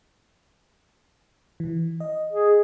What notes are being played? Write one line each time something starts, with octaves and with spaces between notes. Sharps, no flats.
E3
D#5
G#4